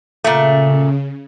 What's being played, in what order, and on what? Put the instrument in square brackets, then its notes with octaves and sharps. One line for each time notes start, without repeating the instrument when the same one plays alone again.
[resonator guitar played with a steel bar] A#2 A3 [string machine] C#3